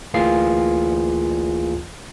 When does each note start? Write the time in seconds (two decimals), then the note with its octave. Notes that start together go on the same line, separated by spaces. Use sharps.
0.14 D2 E3 A#3 F4 G#4 C7